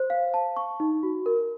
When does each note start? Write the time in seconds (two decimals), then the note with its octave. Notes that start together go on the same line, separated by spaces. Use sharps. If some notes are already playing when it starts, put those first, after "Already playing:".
Already playing: C5
0.10 F5
0.34 A5
0.57 C#6
0.80 D#4
1.03 F#4
1.26 A#4